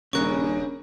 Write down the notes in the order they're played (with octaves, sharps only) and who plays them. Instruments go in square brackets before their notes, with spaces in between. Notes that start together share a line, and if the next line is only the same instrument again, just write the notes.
[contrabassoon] D#1 [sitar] G2 C#3 [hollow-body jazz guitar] C#4 A#4 [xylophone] C#6 F#6